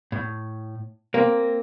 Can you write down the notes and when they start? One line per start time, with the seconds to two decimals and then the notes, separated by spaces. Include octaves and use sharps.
0.12 A2
1.14 A#3 C4